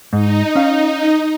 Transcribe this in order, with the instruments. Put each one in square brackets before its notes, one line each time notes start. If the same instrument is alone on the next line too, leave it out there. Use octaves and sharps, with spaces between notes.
[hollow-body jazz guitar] G#2 [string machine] D#4
[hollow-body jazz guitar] C#4 F5